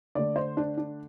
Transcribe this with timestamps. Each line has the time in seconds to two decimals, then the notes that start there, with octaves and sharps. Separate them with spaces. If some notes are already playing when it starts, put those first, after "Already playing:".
0.15 D3 A3 D5
0.36 C5
0.57 D4
0.77 D4